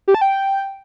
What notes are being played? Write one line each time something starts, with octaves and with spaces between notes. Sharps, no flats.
G4
A5
G5